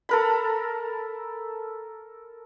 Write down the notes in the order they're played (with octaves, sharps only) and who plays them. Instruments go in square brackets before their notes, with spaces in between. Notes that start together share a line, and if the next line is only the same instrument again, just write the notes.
[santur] A4 A#4 B5